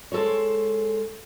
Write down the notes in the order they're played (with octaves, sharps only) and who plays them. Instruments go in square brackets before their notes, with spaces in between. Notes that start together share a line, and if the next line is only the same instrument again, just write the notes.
[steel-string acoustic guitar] G#3 A4 C5 C#5